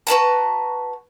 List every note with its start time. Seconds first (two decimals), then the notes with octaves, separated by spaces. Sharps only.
0.07 F#4 B4 A5 A#5